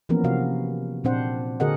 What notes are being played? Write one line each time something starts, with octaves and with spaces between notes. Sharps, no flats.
E3 F3 A#3 B3 C#4 A#4
C3 F#4 F5
A#2 C4 D4 C5 F#5
D3 F#4 G#4 A#4 D#5 F#5